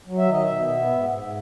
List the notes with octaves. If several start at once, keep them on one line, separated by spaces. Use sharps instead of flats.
F#3
E5
D#3 D#5
B2 E5
B3
G#2
G#2